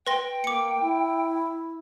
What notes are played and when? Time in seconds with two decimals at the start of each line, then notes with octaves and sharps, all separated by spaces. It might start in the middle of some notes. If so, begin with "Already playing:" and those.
0.07 B4 G5 C6 A#6
0.44 A#3 D6 C#7
0.81 E4